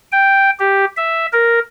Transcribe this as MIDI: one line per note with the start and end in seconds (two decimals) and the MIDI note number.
0.12 0.50 79
0.59 0.85 67
0.97 1.26 76
1.33 1.59 70